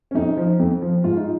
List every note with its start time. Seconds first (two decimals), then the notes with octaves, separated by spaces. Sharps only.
0.11 C#4
0.14 F2 D#4
0.37 F3
0.59 F2
0.82 F3
1.04 G#2 F4
1.17 D#4